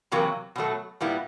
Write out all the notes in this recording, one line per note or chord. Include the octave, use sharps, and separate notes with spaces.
E2 C3 F#3 A#3
B2 F#3 A3
A#2 G3 B3 E4